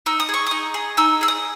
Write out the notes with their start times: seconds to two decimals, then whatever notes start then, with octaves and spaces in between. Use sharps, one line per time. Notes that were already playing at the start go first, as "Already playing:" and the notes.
0.06 D#4 E6
0.20 D#6
0.29 G#4 C#6
0.47 D#4 D#6
0.74 G#4
0.97 D#4 E6
1.21 G#4 E6
1.28 D#6